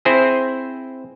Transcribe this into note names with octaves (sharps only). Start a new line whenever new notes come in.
C4 E4 G#4 C5